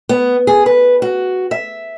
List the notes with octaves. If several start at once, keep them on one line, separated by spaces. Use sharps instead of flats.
B3
G#4
B4
F#4
E5